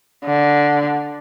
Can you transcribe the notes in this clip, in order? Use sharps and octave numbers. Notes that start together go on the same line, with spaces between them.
D3